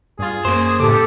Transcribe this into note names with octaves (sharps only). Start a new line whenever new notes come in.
G2 F4 G#4
F#2 A#3 C5
A2 C#3 G4 A4 D6